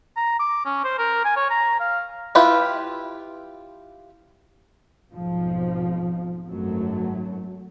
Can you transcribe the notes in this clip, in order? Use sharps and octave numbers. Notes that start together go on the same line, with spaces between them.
A#5
D6
C#4
C5
A#4
G#5
C#5
A#5
F5
E4 F4 G4 B4
B1 F2 G#2 F3
G#1 F#2 F#3 A3